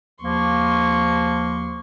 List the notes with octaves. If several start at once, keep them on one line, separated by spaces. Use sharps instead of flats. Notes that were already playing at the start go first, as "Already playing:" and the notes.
D#2 F3 A#3 C6 C#6